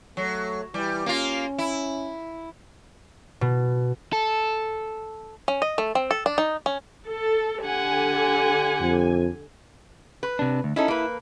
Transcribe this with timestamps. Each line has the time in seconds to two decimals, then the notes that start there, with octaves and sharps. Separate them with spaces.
0.17 F#3 A3
0.74 E3 G3
1.06 A#3 C#4 F4
1.58 E4
3.41 B2
4.13 A4
5.48 C#4
5.62 D#5
5.78 A3
5.95 C4
6.11 A4
6.26 D4
6.38 D#4
6.66 C#4
7.06 A4
7.62 D3 G4 F#5 G#5
8.81 F2
10.23 B4
10.39 C3 D4
10.64 D2
10.76 C#4 D#4 E4 A4
10.88 A#3 B4